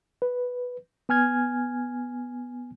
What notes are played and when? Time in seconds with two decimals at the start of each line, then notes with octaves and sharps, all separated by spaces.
0.22 B4
1.09 B3 G#5 F6 G#6